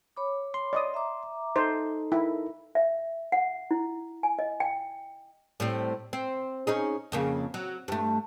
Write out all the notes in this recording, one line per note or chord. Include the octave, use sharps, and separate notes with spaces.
C#5 B5 D6
C6
D5 D#5 D#6
E5 A#5 D6
D#4 A4 C5
E4 A#4
E5
F#5
E4
G#5
D#5
G5
A2 G3 C4
C4
C#4 D#4 G#4
F2 C#3 A#3
F#3
G2 A3